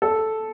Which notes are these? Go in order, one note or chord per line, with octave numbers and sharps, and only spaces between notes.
A4